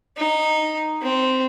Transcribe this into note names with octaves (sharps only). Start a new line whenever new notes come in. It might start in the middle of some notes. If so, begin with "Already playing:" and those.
D#4
C4